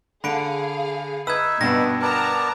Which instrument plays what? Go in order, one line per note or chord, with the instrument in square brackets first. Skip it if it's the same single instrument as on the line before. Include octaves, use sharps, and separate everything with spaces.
[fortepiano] D3 [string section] G#4 F5 [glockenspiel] B5 D7
[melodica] D#4 E5 [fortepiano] B4 [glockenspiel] E6 G#6
[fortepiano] G2 D4 B5 [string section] B2 [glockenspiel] A#6
[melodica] B3 A#4 D5 [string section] A5 A#5